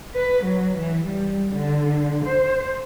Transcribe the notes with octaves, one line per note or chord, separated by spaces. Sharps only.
B4
F#3
E3
G3
D3
C5